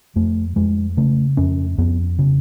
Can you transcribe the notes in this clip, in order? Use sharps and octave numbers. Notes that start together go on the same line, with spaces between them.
F2 A3
F2 G#3
C#3 A3
F2 C#4
F2 B3
C#3